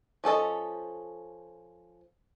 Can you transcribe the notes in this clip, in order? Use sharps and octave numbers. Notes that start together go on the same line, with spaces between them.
F3 C#4 A4 D#5